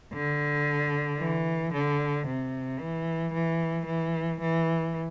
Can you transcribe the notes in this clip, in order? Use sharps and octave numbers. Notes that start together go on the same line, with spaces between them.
D3
E3
D3
C3
E3
E3
E3
E3